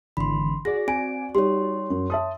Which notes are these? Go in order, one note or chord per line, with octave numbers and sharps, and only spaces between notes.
G#1 D3 E3 B5 C6
F#4 G#4 D5 A#6
C4 G#5 D7
G3 D#4 C#5 C6
F#2
E5 A5 D#6